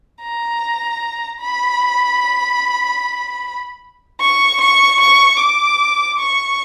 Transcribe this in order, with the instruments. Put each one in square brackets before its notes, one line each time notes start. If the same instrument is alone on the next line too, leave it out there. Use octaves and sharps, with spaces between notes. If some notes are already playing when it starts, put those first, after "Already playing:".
[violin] A#5
B5
C#6
C#6
C#6
D6
C#6